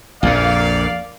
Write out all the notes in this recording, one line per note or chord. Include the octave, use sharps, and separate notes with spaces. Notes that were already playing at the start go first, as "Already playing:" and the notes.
A#1 F2 A#2 A#4 D5 F5